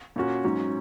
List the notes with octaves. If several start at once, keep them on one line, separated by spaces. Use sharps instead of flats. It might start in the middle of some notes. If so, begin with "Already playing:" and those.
A#2 A#3 C#4 F#4
G#2 F#3 C#4